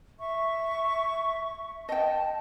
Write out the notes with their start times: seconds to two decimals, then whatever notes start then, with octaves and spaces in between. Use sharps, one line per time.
0.20 E5 C#6
1.89 D#5 G5 A5